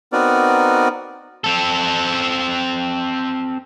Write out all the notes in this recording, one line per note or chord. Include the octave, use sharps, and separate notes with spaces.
B3 C4 D#4 F#4 A#4 D5
C4 A4